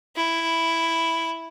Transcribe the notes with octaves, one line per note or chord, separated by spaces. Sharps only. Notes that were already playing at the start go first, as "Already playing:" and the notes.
E4